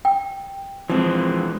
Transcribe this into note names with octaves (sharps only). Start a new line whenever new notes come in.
G5
E3 F3 G3 G#3 C4